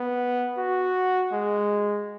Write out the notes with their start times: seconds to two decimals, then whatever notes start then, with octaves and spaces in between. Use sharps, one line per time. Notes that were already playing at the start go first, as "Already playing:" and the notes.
Already playing: B3
0.57 F#4
1.32 G#3